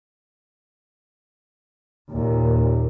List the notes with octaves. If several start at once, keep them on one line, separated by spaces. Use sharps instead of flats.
D#2 A#2